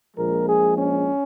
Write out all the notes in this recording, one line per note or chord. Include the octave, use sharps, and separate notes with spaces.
A#1 A#2 F3 G#3 A#4
G#4
C#4